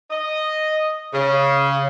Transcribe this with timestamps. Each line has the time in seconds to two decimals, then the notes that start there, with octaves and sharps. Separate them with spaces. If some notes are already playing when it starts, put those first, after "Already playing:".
0.11 D#5
1.13 C#3